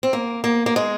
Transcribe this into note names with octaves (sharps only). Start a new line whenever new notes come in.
C4
A#3
A#3
A#3
G#3